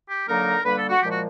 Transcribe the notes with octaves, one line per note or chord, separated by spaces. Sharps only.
G4
D3 F#3 A#3 D#4 A#4
D3 G3 A#3 B4
A4
F#4
A#2 F3 G#3 G4
F#4